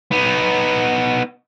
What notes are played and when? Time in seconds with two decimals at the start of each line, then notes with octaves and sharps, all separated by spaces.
0.12 B3 D#4